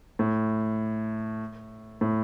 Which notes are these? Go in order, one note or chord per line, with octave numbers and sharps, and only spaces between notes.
A2
A2